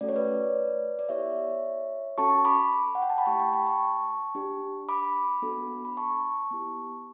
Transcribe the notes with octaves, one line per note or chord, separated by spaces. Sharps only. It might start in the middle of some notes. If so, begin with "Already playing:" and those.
A3 C#4 F#4 A4 D5
C#5
B4 D5
D5
B3 E4 G4 C#5 E5
C#4 F#4 A4 A5 C#6
B5 D6
F#5
G5
A5
B5
A3 E4 G4 A5 C#6
G5 B5
G5 B5
A5 C#6
D4 G4
B5 D6
B3 D4 F#4 A4
B5
A5 C#6
B3 E4 G4